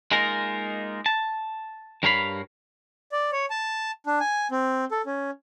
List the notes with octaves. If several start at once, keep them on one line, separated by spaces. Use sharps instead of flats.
G#3 A#3 D#4 F4 A#4
A5
G2 G3 A#4 C#5 F5 B5
D5
C#5
A5
D4
G#5
C4
A4
C#4